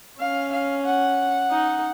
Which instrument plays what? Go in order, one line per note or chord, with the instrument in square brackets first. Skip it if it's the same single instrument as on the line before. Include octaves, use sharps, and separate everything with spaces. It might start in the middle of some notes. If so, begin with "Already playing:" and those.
[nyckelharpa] C#4 [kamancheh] F5
[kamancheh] F5
F#5
[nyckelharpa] D#4